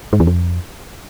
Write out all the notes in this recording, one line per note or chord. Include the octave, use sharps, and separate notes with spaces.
G#2
E2
F2